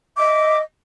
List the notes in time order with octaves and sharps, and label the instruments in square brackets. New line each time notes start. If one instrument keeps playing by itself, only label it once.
[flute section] D#5 E5 D6